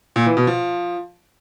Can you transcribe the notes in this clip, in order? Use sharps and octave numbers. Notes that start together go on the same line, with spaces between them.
A#2
E3
B2
F3